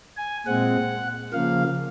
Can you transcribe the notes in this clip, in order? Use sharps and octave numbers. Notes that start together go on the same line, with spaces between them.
G#5
A#2 G#3 C4 F#5
C#3 F3 A#3 F5